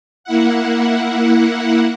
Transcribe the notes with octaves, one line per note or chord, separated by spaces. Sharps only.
A#3 E4 F#5